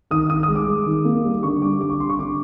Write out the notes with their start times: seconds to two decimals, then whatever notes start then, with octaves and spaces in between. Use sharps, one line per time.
0.11 D#3 D#6
0.29 D#3 D#6
0.43 D#6
0.48 G#3
0.56 D6
0.68 G#3
0.86 D#3
1.05 A#3
1.24 G3
1.43 D3 C#6
1.62 G3 D6
1.80 D3 D6
1.90 C#6
1.99 D3 C6
2.09 C#6
2.19 D3 D6